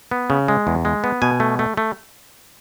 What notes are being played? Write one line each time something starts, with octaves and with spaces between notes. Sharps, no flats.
B3
C#3
G#3
E2
G#3
B3
B2 G#5
A3
A3
A3